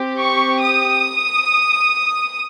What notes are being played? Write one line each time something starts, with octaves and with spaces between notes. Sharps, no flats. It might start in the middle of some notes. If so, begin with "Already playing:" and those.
Already playing: C4 G4
C#6
D#6